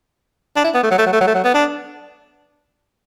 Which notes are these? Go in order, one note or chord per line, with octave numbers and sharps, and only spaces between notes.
D4
E4
B3
A3
F#3
A3
F#3
A3
F#3
A3
F#3
B3
D4